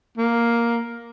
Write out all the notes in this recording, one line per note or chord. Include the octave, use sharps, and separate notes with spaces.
A#3